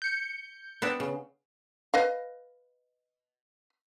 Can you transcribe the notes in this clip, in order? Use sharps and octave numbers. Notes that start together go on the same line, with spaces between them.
G6 C#7
B3 C4 D4
C#3
B4 D#5 F5